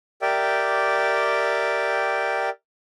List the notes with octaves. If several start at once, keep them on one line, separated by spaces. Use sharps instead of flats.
G4 A#4 D5 E5 G5